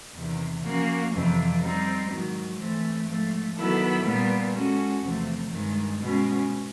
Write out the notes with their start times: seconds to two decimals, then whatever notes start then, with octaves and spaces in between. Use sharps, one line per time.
0.14 E2 C3 D#3
0.62 F3 A#3 C#4 F#4
1.11 F2 C3 E3
1.59 G3 C4 D#4
2.08 G#2 D#3 F#3
2.56 E3 A3 C4
3.06 G#2 F3 A3
3.54 D#3 F#3 B3 E4 A4
4.03 A#2 G3 B3
4.52 G#3 C#4 F#4 A4
5.00 E2 C3 F3 A3 C4
5.49 G2 D#3 G#3
5.98 B2 G#3 C#4